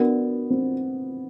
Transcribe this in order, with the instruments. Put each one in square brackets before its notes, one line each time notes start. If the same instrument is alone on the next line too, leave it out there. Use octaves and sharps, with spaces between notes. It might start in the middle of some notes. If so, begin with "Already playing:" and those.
Already playing: [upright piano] B3 [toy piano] D4 F#4 A#4 D5
[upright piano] C4